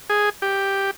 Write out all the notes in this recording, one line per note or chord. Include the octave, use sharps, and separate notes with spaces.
G#4
G4